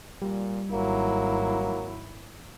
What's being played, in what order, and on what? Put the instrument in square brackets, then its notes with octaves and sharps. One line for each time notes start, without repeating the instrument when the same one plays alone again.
[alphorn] A#2 [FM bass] G3
[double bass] G#1 E4 [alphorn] F#3 [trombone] A#3